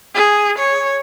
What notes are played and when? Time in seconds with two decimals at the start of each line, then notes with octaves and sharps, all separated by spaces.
0.15 G#4
0.58 C#5